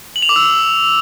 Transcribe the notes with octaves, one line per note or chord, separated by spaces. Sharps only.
F#7
F7
D6
E6